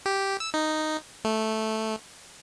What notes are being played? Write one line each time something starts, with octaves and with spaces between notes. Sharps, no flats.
G4
E6
D#4
A3